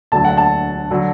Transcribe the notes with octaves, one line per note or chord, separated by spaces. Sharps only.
E1 D2 D3 F#3 A5
F#5
A5
D3 F#3